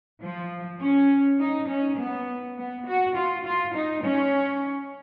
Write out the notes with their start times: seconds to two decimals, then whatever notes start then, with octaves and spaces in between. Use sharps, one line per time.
0.22 F3
0.81 C#4
1.40 D#4
1.69 C#4
1.98 B3
2.58 B3
2.87 F#4
3.16 F4
3.45 F4
3.75 D#4
4.03 C#4